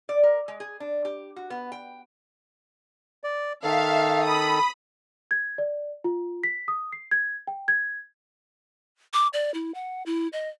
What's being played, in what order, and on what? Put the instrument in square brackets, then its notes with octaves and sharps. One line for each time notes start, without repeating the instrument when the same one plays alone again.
[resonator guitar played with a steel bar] D5
A#4
G#3
G#4
D4
G4
F#4
B3
G5
[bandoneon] D5
[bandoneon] D#3 A4 [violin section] E5 F5
[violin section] B5 D#6
[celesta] G#6
D5
F4
B6
D#6
C7
G#6
G5
G#6
[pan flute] D6
D5
E4
F#5
E4
D#5